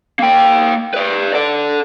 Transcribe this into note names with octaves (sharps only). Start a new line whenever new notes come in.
A#3 G5
B4 D5
A4 D5